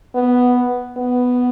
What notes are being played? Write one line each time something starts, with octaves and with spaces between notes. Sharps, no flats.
B3
B3